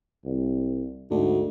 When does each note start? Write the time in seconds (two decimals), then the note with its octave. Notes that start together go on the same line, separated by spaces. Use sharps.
0.25 C2
1.11 D2 G#2